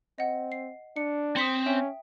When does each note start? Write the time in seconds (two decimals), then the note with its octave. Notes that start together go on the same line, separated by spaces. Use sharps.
0.18 C4 D#5 F#5
0.52 C7
0.96 D4 C#7
1.36 C4 C6 D#6 B6 C#7
1.66 C#4 E5 G5